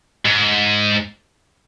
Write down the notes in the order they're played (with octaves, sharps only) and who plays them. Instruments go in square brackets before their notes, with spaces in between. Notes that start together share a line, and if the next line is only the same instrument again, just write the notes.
[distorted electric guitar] G#2